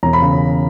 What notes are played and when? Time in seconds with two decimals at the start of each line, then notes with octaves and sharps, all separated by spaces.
0.03 E1 A#5
0.13 B5
0.22 C#3